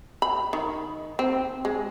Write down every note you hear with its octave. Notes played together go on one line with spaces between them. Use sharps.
B5
D#3
C4
G#3